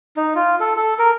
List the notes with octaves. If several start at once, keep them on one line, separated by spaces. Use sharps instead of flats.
D#4
F4
A4
A4
A#4